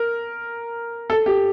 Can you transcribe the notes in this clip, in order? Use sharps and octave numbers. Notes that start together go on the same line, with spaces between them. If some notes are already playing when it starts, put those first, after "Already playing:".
Already playing: A#4
A4
G4